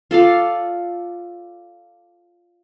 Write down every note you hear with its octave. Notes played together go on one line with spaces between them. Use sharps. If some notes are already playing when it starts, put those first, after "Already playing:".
F4 A4 D5 F5